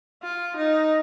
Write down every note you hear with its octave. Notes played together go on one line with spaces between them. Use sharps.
F4
D#4